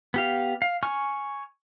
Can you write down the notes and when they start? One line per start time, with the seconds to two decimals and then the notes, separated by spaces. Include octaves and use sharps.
0.14 B3 G4 F5
0.62 F5
0.83 G#5 C#6 F6